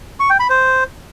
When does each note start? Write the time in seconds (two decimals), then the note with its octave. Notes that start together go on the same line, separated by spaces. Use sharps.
0.20 C#6
0.30 G5
0.40 B5
0.50 C5